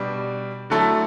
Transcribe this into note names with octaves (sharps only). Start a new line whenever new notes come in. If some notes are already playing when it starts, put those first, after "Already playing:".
Already playing: B2 G3 D4
D3 F#3 A3 E4 A4